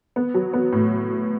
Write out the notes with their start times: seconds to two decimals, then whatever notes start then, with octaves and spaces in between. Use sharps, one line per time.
0.16 B3
0.34 F#3
0.53 B3
0.72 A2